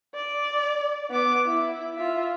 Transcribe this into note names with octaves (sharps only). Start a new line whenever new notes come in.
D5
B3 D6
E4
F4 E5